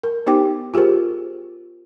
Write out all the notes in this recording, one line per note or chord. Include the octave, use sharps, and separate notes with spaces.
A#4
B3 D#4 G4 C5 G5 D6
F4 G4 G#4 A#4 C5